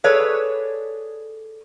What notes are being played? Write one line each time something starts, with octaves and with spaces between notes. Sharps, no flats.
G#4 A4 B4 C#5 D5